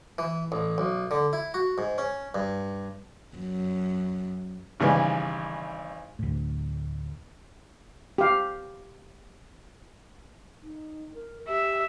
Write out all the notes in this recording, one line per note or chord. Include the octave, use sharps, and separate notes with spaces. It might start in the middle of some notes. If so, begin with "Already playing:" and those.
E3
A1
B1
D3
E4
F#4
G#2
C#4
G2
F#2
G#1 C#3 E3 G3 B4
D2 A2
G4 F5
D#4
A#4
G4 E5